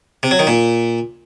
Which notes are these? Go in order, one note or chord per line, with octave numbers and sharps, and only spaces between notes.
C3
F#3
D#3
A#2